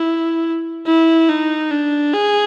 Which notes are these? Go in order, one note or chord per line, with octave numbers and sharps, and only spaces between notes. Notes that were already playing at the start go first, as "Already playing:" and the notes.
Already playing: E4
E4
D#4
D4
G#4